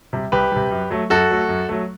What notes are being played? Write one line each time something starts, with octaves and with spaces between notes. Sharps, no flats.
C3 G3
C2 G4 B4
C3 G3
F#2
F#3 A3
F#2 F#4 A4
F#3 A3
F#2
F#3 A3